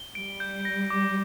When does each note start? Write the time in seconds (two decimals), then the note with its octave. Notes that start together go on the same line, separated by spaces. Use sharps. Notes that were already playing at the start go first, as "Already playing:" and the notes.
Already playing: G7
0.15 G3 D7
0.40 G6
0.65 A#6
0.90 D6